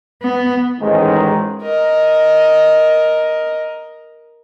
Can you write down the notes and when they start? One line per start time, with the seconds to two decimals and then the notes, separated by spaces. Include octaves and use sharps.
0.21 B3
0.81 A1 G#2 D#3 G#3
1.62 A#4 D#5